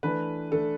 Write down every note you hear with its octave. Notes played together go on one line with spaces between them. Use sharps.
E3 A3 D4 B4
E3 A3 D4 A4